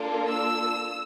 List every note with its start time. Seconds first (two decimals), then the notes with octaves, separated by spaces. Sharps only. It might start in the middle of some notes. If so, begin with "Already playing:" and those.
Already playing: A#3 D4 F4 A4
0.29 E6